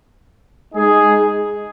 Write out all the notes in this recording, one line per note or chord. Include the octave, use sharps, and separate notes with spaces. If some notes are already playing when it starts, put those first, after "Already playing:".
G#3 D#4 G#4